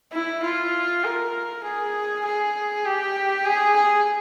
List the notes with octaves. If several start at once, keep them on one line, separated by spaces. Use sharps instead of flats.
E4
F4
A#4
G#4
G#4
G4
G#4
G#4